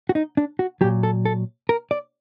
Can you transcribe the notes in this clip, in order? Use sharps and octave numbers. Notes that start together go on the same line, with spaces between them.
F#4
D#4
D4
F#4
A#2 F#3 G4
A4
A4
A#4
D5